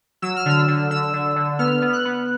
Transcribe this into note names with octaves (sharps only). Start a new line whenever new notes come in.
F#3 E6
F6
D3 E6
D3
D3 E6
D3
D3
B3 F6
B3
F#6
B3